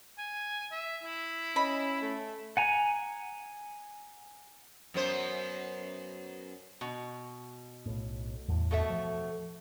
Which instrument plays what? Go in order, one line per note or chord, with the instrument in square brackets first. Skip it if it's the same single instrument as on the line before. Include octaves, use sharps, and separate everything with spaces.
[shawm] G#5
E5
E4
[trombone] C#4 [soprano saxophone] D#5 [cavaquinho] B5
[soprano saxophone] A3
[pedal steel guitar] F#5 G#5 A#5
[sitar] F#2 B3 C5
[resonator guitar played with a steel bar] B2
[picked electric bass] B1 A2
G1 E2 A2
[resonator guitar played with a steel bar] B2 A3 E5
[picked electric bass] F3